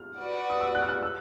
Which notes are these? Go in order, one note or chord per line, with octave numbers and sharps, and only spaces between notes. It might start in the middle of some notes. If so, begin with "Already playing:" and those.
Already playing: F6
F#4 B4 D5 F#5
D#6
E6
F#6
F6
F#6
E6